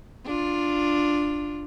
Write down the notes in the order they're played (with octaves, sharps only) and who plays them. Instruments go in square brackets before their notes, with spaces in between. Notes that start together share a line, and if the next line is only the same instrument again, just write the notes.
[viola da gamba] D4 F4